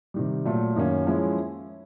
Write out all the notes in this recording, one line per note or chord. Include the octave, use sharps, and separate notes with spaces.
C3 D#3 G3
A#2 F#3 A3
F#2 D#3 F#3 A#3 C#4
F3 G#3 C#4 E4